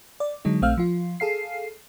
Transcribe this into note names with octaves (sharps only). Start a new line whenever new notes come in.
D5
D3 F#3 G#3 D#4
A#1 A3 C4 F5 E6 F6
F3 F4
G#4 A4 F5 C7